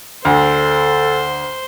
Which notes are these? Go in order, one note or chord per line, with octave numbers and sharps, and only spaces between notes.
D2 A4 C5